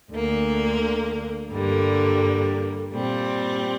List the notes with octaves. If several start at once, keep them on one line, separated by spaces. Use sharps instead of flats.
D2 D3 A#3
G2 D3 G3 A#3
A#2 G3 C4